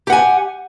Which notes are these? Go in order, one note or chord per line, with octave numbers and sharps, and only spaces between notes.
G4 F#5 G#5